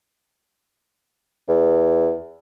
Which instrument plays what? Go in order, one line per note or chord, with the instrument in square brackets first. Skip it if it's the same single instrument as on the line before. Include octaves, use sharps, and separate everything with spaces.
[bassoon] E2